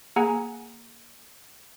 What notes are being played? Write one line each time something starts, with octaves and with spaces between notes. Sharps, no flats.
A#3 G#4 F#5 G#5 A#5